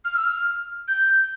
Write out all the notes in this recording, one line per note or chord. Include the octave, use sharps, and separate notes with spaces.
F6
E6
F6
G6